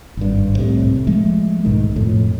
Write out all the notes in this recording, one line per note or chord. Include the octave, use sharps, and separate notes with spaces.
G#1 G2
C2 A2 C3
F3 G#3 A3
B1 G#2 B2 D#3
F2 A2